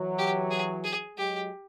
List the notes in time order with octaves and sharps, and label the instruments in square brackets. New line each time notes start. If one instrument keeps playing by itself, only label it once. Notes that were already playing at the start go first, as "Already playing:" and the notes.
Already playing: [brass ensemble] E3 F#3
[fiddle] G4
G#4
G#4
[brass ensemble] F#3 G#3 [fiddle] G4